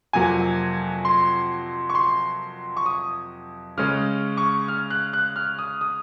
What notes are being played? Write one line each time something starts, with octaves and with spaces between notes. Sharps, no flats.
F2 C3 F#3 A#3 G#5
C6
C#6
C6
C#6
D#6
C#3 G#3 C#4 F6
C#6
F6
F#6
F#6
F6
D#6
D#6